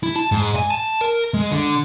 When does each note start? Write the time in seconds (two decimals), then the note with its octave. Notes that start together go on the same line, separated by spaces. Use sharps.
0.03 E4
0.16 A5
0.32 G#2
0.56 G#5
0.71 A5
1.01 A#4
1.34 G#3
1.51 D3